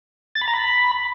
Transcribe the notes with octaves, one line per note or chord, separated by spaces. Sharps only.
A6
B5
A#5
B5